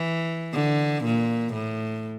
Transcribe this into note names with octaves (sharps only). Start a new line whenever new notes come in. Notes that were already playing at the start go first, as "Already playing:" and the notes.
Already playing: E3
D3
A#2
A2